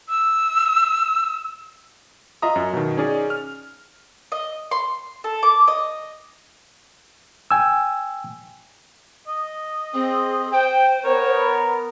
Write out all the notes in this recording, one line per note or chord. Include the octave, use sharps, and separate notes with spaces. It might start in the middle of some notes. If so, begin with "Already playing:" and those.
E6
F4 D#5 E5 A#5 D#6
F#2
B2 D#3
C#4 D#4 G#4 D5
F6
D#5
C6
A4
D6
D#5
G5 G#5 E6
D#5
C4 G#4
C5 G5
B3 A#4 C#5